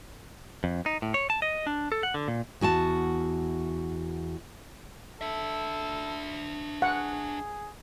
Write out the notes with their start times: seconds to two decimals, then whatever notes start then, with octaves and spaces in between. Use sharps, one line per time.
0.64 F2
0.86 D#4
1.02 A2
1.14 C#5
1.30 A5
1.42 D#5
1.67 D4
1.92 A4
2.03 F#5
2.14 D3
2.28 A#2
2.61 E2 F#4 G#5 A5
5.21 D4 A4 E5
6.82 G#4 F#5